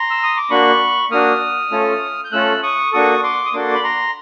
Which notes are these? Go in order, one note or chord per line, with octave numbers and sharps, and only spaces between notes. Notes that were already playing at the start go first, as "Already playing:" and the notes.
Already playing: A#5 C6
E6
D#6
D6
A#3 D4 F#4 B5 C#6
A#3 D4 F#4 D#6 F6
A3 C#4 F4 A4
G6
A3 C#4 F4 A4 E6 F#6
C#6 D#6
A#3 D4 F#4 A4 C#6 D#6
C6 D6
D#6
A#3 D4 F#4 A4 C6 D6
B5
A#5 C6